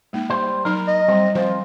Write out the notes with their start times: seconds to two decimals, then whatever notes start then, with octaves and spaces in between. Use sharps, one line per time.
0.13 G#3 A#3 D#4
0.30 G3 C5
0.65 F#3 D#4 A#4
0.88 D#5
1.08 G3 C4
1.35 F3 C4 F4 C5